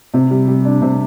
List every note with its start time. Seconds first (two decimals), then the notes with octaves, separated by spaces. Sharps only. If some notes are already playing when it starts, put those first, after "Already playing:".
0.14 C3
0.31 G3
0.48 G3
0.65 D4
0.82 C3